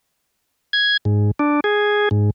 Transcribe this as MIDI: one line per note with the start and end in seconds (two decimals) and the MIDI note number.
0.73 0.97 92
1.05 1.31 44
1.39 1.60 62
1.64 2.09 68
2.11 2.30 44